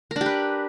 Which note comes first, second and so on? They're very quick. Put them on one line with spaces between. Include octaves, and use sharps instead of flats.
A#4 D4 G4 B4